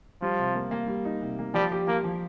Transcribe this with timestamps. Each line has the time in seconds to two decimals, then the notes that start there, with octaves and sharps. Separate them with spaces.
0.22 F3 G3
0.38 C3
0.55 A#3
0.71 A#3
0.88 G3
1.05 D#4
1.21 C3
1.39 A#3
1.54 F3 G3
1.72 G4
1.87 F3 A#3
2.04 F3